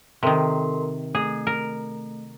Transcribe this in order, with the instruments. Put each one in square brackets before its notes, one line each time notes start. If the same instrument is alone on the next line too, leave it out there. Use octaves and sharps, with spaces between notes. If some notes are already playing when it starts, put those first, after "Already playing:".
[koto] C3 D#3 [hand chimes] A4 A#4 C6
[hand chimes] A3 [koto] G#4
[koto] A#4